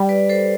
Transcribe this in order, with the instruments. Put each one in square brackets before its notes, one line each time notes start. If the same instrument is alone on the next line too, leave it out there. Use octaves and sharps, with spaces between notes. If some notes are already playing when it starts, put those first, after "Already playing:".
Already playing: [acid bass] G3
[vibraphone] B4 D5
A4 C5